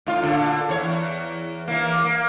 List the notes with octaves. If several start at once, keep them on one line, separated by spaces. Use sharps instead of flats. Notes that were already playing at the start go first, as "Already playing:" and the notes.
A2 F4
A#2 D3
E2 C#5
E3 A#3
A#3